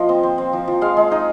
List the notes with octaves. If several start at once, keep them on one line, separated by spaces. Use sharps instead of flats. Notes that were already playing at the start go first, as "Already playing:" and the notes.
Already playing: F3 A#3 F4 C5 D#5
C4
C4
C4
F3
F3
G#3 F5
G#3
D#4